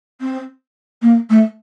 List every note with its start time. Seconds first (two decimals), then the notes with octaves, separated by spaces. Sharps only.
0.21 C4
1.01 A#3
1.29 A3